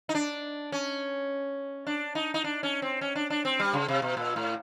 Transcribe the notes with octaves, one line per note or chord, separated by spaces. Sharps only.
D#4
D4
C#4
D4
D#4
D#4
D4
C#4
C4
C#4
D4
D4
C4
G3
C#3
C3
B2
A#2
A2